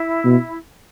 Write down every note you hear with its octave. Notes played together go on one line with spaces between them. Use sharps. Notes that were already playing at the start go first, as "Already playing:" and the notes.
Already playing: E4
B2